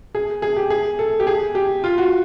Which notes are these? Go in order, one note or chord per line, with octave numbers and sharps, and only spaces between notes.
G#4
G#4
G4
G#4
A4
G4
G#4
G4
F4
F#4